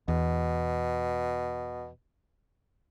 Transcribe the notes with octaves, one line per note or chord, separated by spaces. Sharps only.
E2 B2